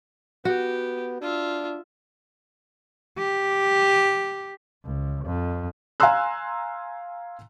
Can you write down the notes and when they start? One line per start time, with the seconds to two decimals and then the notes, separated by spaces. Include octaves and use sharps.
0.45 B3 F#4 G4
1.22 D4 F4 E5
3.18 G4
4.84 C#2
5.25 F2
6.00 F5 G#5 A#5 C6 E6 F#6